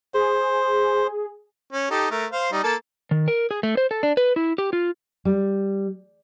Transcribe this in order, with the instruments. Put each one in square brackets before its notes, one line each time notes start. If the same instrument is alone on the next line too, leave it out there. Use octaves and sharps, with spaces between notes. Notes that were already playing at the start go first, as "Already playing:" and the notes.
[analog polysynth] G#4 [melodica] C5
[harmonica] C#4
D#4 G4 A4
A3 A#4
C5 F5
G3 D#4
A#3 A4 A5
[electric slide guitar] D#3
A#4
G#4
A3
C5
A4
D4
B4
E4
G4
F4
[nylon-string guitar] G3